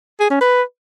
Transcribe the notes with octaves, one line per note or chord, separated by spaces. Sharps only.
G#4
C#4
B4